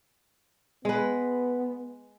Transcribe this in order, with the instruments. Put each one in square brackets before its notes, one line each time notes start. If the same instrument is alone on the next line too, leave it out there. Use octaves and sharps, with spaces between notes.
[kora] G#3 B4 [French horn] B3